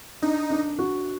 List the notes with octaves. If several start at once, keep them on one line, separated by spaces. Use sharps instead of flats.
D4 D#4
D4
F#4